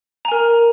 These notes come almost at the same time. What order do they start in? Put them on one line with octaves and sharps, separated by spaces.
A#5 G#5 A#4